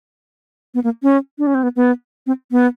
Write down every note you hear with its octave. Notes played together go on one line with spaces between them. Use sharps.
B3
A#3
C#4
D4
C#4
C4
B3
B3
C4
B3